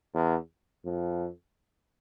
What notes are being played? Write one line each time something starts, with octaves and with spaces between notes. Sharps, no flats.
E2
F2